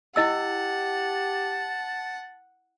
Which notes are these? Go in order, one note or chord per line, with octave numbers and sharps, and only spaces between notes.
E4 G4 D#5 F#5 A5 E6